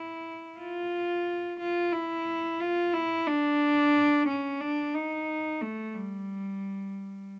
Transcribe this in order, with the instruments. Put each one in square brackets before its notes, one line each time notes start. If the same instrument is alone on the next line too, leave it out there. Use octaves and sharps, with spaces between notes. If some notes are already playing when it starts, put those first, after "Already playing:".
Already playing: [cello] E4
F4
F4
E4
F4
E4
D4
C#4
D4
D#4
A3
G3